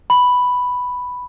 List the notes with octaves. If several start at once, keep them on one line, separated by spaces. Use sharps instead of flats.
B5